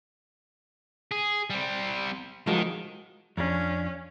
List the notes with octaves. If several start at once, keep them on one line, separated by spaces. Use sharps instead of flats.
G#4
G3 C4
D#3 F3 F#3 G#3
F2 C#4 D4